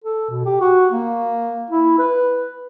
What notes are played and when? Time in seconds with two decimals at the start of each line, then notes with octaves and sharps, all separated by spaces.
0.04 A4
0.30 B2
0.46 G4
0.61 F#4
0.92 A#3
1.70 E4
1.99 B4